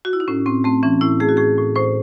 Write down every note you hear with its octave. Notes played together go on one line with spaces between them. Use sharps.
F#4
E4
D#4
A2 C#4
A2 C4
A3 C4
E3 C#4
A2 E4
A3 G#4
F#4
A2 G#4
A2
A2 C5